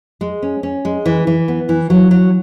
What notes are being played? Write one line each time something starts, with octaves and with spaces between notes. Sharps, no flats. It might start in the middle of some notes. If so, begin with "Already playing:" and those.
G#3
C#4
C#4
G#3
E3
E3
B3
E3
F#3
F#3